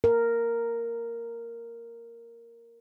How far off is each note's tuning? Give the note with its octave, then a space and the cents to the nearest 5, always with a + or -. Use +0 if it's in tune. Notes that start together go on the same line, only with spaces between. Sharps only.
A#4 -5